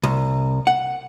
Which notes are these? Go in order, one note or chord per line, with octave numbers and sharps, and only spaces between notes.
C2
F#5